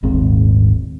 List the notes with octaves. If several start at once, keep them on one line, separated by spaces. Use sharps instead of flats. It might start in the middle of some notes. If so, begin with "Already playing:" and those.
D#1 G#1 G#2 C4